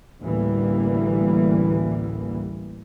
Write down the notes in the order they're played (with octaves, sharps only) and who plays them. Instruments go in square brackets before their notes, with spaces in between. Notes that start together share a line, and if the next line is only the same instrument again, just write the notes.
[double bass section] A1 D2 E3 G3 A#3